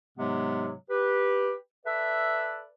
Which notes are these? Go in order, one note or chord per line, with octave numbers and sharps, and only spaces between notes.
G#2 C3 F#3 G#3 B3
G4 B4
A4 B4 D5 E5